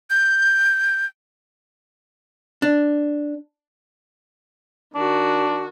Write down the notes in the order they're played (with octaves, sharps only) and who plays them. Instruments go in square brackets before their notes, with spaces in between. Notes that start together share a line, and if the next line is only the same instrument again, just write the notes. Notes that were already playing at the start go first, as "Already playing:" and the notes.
[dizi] G6
[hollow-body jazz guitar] D4
[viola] D#3 F#4 [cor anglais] D4